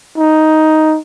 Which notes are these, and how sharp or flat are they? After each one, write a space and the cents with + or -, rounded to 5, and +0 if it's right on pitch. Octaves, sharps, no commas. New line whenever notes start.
D#4 +5